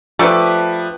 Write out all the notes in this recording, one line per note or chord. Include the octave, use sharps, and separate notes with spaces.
F3 A3 D4 G4 B4